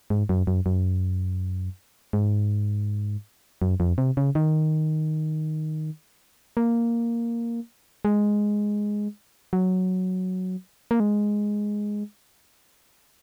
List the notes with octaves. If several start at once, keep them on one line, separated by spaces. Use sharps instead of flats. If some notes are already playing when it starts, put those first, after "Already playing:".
G#2
F#2
F#2
F#2
G#2
F#2
F2
C3
C#3
D#3
A#3
G#3
F#3
A#3
G#3